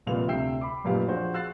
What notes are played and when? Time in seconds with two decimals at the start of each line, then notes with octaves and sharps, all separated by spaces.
0.06 C2 F2 A#2 B3 F5 F7
0.28 D2 C3 E5 G5 E6 C7
0.61 B5 D6
0.84 A1 F#2 A#2 G4 B4 F5
1.08 F3 D4 F#4 G#4 C5
1.34 F5 E6 F#6 A6 C7